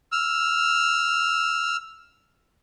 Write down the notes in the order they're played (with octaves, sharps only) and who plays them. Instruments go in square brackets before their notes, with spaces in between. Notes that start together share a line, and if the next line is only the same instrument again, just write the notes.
[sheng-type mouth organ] E6 F6